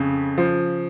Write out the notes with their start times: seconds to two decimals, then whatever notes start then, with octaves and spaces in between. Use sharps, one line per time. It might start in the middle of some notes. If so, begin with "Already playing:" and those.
Already playing: F2 C#3
0.38 F3